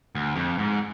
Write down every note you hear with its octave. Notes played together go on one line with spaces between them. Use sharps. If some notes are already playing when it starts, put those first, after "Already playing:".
D2
F2
G#2